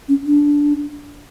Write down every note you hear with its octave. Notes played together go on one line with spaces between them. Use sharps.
C#4
D4